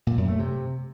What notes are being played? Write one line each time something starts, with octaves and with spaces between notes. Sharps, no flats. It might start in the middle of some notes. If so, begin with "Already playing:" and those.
A#2
F#2
A3
C3